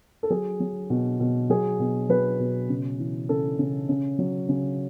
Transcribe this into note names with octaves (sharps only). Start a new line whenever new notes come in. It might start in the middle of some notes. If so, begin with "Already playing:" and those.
A4
F#3 G#4
F#3
B2
B2
F#3 G#4
B2
F#3 B4
B2
C#3
E3
C#3 A4
C#3
C#3
F#3
C#3